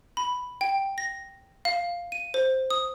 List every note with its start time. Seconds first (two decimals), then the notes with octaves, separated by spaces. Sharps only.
0.17 B5
0.61 G5
0.98 A#6
1.65 F5
2.12 D#7
2.34 C5
2.70 D#6